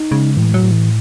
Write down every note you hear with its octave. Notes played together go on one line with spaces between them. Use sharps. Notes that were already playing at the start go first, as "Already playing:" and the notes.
Already playing: D#4
C#3 G#3
A2 E3
F#3
A2
E3